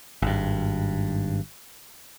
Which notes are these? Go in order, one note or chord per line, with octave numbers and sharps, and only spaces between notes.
G#1 G2